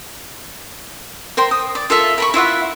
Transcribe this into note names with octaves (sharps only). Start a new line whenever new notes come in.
A#4 C5 G5 C6
D#6
D5
F4 A4 A#4 E5
A#4 B5 C#6
E4 F4 E5 F#5